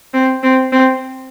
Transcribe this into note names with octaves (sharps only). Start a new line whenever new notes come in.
C4
C4
C4